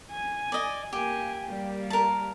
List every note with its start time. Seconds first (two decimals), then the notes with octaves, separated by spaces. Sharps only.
0.11 G#5
0.52 D5 D#5
0.93 A#3 G4 G#5
1.45 G3 A#3
1.90 A#4 A5